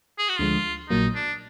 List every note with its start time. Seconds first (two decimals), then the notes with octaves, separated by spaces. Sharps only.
0.18 G#4
0.29 F#4
0.38 D2 D3 F3 G#3 F4
0.89 A#1 A#2 F#3 A#3 D#4
1.15 D4